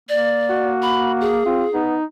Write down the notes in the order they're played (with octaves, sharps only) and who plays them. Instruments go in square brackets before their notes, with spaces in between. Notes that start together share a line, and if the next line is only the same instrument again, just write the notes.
[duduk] A#3 [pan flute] D5
[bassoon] F#4
[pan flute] B5
G#4
[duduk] C4 [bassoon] F4
[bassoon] B3 [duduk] D#4